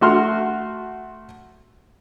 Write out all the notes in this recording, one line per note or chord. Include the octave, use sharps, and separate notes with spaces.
A3 F#4 C6 F6